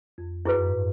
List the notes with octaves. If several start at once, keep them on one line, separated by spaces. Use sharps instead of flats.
F2
F#2 E4 G#4 B4
G#2